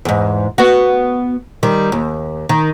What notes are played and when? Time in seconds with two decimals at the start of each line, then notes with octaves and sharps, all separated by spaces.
0.05 E2 G#2
0.58 B3 F#4
1.63 D#3 G3
1.92 D#2
2.49 D#3